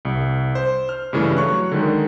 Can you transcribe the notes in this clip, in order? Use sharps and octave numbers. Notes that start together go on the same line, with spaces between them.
C2
C5
F6
G2 C#3 E3 A3
F#3 C#5 C#6 F#6
D3 D#3 G#3